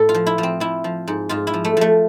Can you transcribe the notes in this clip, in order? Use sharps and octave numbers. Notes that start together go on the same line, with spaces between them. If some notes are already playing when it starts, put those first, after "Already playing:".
Already playing: A2 A4
F4
F3
E4
F3
C4
F3 E4
F3
G#2
G#2 F4
E4
F3
A3
F3 A3